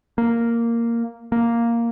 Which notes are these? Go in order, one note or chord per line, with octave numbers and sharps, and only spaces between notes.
A#3
A#3